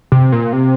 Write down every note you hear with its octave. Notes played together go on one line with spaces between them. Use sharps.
C3
A#2
C3